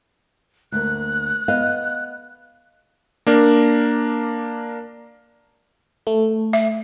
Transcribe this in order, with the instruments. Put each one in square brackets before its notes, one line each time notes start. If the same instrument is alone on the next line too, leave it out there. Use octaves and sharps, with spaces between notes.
[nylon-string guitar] D2 A#3 [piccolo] F#6
[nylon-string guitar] B3 D#5 F5
[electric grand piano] A#3 D4 A#4
[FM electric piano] A3
[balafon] E5